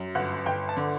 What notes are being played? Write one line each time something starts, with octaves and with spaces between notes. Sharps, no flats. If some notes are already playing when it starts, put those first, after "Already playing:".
Already playing: F#2
G1 F#5
G1 G5
A5
D3